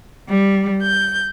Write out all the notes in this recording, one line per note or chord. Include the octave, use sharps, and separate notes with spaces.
G3
G6